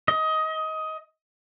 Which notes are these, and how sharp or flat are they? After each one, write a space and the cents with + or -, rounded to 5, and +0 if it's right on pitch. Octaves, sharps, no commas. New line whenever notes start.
D#5 +20